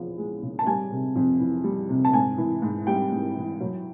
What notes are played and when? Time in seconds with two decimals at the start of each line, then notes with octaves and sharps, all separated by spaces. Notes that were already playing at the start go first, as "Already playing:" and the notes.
Already playing: E2 C#3 F3
0.18 G#3
0.42 C#3
0.59 A5
0.67 G3 G#5
0.91 C3
1.16 F2
1.39 E3
1.64 G3
1.89 C3
2.05 A5
2.13 G#2 G#5
2.38 E3
2.62 G#2
2.87 G3 G5
3.12 G#2
3.36 E3
3.60 F#3